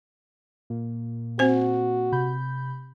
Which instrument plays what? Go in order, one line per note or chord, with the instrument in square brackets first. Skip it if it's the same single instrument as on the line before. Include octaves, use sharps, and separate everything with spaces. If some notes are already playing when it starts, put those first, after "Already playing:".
[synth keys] A#2 A#3
[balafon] C4 C5 [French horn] F#4
[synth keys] C3 B5 G6